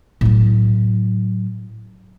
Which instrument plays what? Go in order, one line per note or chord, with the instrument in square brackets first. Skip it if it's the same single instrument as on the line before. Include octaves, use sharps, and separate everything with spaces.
[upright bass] A2 F#3